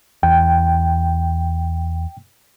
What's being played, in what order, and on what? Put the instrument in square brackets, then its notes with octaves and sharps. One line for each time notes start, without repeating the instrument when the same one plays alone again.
[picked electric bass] E2 [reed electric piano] G5